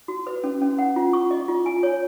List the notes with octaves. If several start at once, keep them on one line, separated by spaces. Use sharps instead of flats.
F#4
B4
C#4
C#4
F#5
F4
C#6
D#5
F4
G#5
C#5